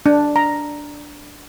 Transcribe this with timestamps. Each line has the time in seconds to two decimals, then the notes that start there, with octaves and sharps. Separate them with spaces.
0.06 D4
0.36 A#5